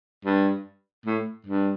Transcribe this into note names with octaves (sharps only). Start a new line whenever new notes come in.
G2
A2
G2